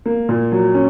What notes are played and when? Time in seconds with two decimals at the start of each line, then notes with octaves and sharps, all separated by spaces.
0.06 A#3
0.29 A#2
0.52 F#3
0.74 C#4